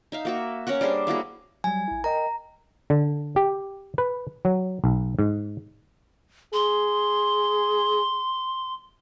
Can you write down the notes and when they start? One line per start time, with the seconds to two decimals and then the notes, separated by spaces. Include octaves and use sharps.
0.12 D#4 E5 F5
0.25 A#3 F#4 E5
0.67 C#4 A#4 C#5 F#5
0.81 G3 D4 G#4 C5
1.07 A#3 E4 F#4 G#4
1.64 F#3 G3 G#5
1.88 A1 E4
2.04 A#4 D#5 G5 A#5
2.90 D3
3.36 G4
3.98 B4
4.45 F#3
4.84 B1
5.19 G#2
6.53 G#4 C6